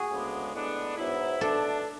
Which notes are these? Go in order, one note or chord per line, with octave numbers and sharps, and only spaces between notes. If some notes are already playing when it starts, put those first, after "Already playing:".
Already playing: F#4 G#4
D2 C#3 G#3 B3 D4
A2 G#3 B3 D4
G#2 F#3 B3 E4
B2 A3 D4 A4